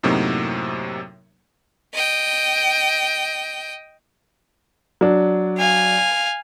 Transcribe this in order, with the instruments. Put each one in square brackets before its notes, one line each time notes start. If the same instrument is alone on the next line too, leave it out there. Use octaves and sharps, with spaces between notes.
[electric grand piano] F#2 A2 C3 F#3 A#3 D#4
[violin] D#5 G5
[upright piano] F#3 D4
[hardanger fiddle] F5 G#5